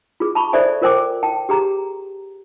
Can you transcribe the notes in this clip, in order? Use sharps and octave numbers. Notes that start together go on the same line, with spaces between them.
F4 G#4
A5 B5 C#6
A4 C5 D5 E5 G#5
F4 A#4 C5 G5 G#5 D6
G5 A5
G4 G#4 A#5